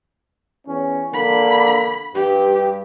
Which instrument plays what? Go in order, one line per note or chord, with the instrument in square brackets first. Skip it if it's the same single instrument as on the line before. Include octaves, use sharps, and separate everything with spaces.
[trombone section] E2 C#4
[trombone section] D3 A#3 D4 [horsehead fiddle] B5
[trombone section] G2 [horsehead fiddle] G4